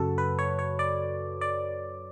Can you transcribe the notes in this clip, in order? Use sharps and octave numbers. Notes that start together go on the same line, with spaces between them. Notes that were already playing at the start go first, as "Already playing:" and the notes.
Already playing: F#2 C#3 F#3 F#4 A4
B4
C#5
C#5
D5
D5